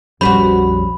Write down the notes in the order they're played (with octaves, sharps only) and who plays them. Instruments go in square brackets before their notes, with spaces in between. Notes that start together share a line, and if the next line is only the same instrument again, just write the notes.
[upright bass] A#1 F2 [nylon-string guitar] G3 C#4 [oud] F#4 B4 C5 [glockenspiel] B5